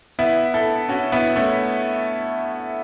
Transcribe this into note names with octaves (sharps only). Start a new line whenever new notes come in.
B3 E4
E4 A4
C#4 F#4
B3 E4
A3 C#4